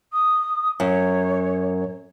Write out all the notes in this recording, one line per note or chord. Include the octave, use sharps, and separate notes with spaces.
D#6
F#2 C#5